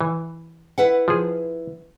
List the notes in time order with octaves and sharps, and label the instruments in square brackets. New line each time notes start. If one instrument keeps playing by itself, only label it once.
[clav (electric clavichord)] E3
[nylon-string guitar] E4 B4 F#5
[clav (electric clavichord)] F3 G#4